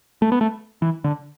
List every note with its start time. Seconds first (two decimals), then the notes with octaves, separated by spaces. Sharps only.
0.22 A3
0.32 B3
0.41 A3
0.82 E3
1.04 D3